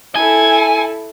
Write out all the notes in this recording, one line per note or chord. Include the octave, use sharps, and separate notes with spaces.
E4 A4 G#5